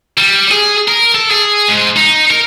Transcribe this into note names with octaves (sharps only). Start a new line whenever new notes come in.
G3
G#4
A#4
A4
G#4
G#2
D#4
A#4